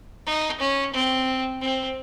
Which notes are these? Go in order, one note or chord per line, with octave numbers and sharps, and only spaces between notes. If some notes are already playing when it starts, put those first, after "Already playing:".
D#4
C#4
C4
C4